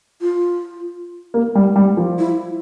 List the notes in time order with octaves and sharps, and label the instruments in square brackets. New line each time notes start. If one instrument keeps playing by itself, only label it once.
[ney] F4
[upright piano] A#3
G3
G3
F3
[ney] E4